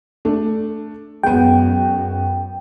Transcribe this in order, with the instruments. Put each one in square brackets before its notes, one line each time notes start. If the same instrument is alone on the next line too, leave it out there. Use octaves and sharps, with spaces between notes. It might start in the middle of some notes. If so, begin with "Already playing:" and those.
[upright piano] A3 D4
[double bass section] F#2 [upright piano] G#3 B3 [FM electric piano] G5